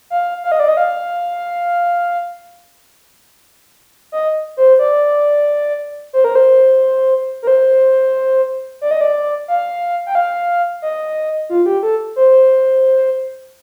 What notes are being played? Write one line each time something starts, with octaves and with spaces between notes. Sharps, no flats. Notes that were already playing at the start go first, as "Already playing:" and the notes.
F5
F5
D#5
D5
D#5
F5
D#5
C5
D5
C5
A#4
C5
A#4
C5
D5
D#5
D5
F5
G5
F5
D#5
F4
G4
A4
C5